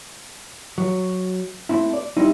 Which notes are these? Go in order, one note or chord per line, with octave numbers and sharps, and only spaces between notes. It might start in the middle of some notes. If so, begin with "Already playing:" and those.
F#3
A3 C4 E4
D5
G3 C4 D#4 E4